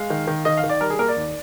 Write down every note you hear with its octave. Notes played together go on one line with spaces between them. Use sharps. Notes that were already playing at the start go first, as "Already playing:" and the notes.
Already playing: G#3 F5
D#3
D#3
D#3 D#5
F5
D#3
D5
G3 A#4
G#4
A#3 A#4
D5
D#2